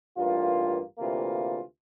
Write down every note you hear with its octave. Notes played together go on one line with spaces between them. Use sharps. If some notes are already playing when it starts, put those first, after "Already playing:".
A1 G2 A#3 F4
D2 C3 E3 A#3 F4